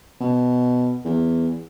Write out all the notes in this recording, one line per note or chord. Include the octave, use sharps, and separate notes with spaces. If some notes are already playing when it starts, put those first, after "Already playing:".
B2
E2